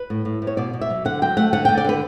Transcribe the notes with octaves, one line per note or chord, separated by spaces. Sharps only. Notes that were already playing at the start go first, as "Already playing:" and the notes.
Already playing: B4
A2
A2
A2
C#5
B2 D5
B2
E5
F#3
D3 F#5
F#3 G5
A3 F#5
D3 F#5
D3 G5
D5
D3 B4